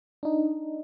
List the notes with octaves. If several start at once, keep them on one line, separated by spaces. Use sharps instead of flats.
D4 D#4